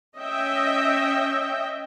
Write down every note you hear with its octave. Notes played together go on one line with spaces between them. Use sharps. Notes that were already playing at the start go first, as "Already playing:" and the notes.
C#4 D#5 E5 G5